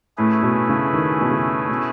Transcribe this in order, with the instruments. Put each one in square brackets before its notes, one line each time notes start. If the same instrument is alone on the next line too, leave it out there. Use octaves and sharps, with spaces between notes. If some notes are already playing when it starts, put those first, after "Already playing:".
[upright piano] A2 [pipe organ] A3 C#4 E4 G#4 B4
[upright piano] B2
C#3
D#3
B2
C#3
B2